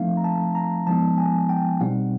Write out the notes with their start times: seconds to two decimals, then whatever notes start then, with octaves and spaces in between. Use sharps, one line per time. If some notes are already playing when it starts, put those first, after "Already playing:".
Already playing: F3 A3 C4 D#4 F5
0.17 A#5
0.24 A5
0.55 A#5
0.87 F3 G#3 B3 D#4 A5
1.18 G#5
1.49 G5
1.80 B2 G3 C4 D#4 F#5